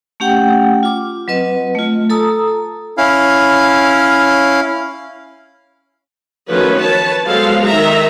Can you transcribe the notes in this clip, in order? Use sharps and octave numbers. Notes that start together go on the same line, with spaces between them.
A3 C#4 G4 F#5 G5
F4 D6
F#3 C4 B4 D#5
A3 F4
A4 A5 A#5 D#6 E6
C#4 E4 F5
D#3 F3 F#3 A3 C#4 B4
B4 C#5 A5
F3 F#3 G#3 B3 A4 F5
D#3 D#4 E5 A#5